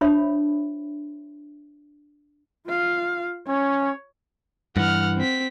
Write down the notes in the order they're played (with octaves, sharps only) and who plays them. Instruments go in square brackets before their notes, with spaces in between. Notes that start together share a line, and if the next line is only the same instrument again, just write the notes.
[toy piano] D4 F4 C5 C#5 E5 B5
[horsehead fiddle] F4 F5
[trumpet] C#4 [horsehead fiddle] C#5
[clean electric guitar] G2 E3 [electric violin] F#5 F6
[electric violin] C4 B6